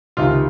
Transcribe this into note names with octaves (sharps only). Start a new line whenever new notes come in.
C#2 C3 D#3 F4